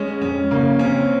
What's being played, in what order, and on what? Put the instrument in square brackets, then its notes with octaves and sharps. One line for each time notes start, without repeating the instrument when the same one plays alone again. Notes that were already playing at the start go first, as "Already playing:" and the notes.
Already playing: [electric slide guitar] G#3 [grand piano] C#4
[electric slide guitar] F2 [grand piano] C#4
[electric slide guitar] C#3 [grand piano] A#3
[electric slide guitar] C4 [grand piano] C#4